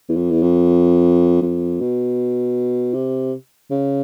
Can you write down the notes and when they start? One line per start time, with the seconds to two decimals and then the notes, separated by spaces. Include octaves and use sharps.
0.09 E2
0.16 F2
0.31 E2
0.42 F2
1.42 F2
1.81 B2
2.94 C3
3.70 C#3